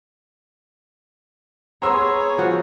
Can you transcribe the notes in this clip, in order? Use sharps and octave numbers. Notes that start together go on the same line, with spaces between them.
B3 G#4 C#5 A#5 C6 E6
F3 F#4 F#5